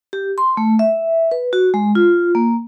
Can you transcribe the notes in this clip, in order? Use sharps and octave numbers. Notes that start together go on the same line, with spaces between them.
G4
C6
A3
E5
B4
F#4
G#3
F4
A#3